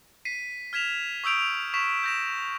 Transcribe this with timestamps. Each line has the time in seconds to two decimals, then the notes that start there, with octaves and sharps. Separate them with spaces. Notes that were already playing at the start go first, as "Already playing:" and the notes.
0.25 B6 C7 D#7
0.73 F6 G#6 B6 E7 F7
1.24 C#6 D#6 E6 G6 D7 F7
1.74 C#6 B6 E7
2.03 G6 A#6 E7